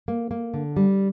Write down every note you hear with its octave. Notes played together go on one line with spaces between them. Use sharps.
A#3
A#3
D3
G3